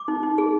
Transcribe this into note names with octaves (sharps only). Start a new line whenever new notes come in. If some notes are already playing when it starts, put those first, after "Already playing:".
Already playing: D6
D#4
D#4
G#4